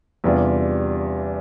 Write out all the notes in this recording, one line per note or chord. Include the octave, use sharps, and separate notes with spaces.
E2 C3 G3 D4 F4